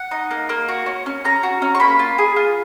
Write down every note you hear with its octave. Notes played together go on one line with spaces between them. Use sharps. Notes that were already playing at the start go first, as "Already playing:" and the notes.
Already playing: F#5
D#4
A#3
A#3
F#4
C#4
C#4
C#4 A#5
F#4
C#4
C#6
A#3 B5
F4
G#4
F4